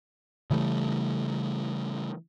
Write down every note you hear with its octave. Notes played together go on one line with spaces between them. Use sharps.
C#3 E3 G3 A3